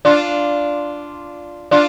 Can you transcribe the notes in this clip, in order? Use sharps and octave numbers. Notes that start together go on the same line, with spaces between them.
D4 F4
D4 F4